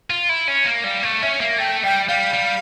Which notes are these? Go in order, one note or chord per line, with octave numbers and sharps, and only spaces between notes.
F4
E4
C#4
A#3
G3 F5
A3
C#4 E5
A#3
A3 G5
G3 G5
G3 F5
G3